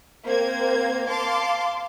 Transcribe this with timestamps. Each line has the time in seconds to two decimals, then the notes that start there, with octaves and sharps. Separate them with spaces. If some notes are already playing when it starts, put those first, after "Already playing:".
0.25 A#3 C4 C5 G#6
1.07 F5 A5 C6 D6